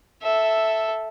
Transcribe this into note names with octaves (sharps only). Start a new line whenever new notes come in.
A4 E5